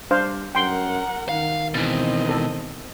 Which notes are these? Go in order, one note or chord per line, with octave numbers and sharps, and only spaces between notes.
G3 D4 C5 F5
F#2 A#4 F#5 G5 C6
D#3 F5
B2 E3 C4 D#5
A4